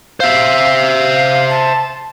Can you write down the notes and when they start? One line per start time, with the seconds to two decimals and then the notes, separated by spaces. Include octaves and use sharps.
0.20 C5 E5 F5
1.49 A5